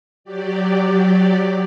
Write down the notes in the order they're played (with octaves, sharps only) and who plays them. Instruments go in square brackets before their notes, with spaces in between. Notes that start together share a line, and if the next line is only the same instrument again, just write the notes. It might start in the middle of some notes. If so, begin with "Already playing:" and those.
[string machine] F#3 G4 D5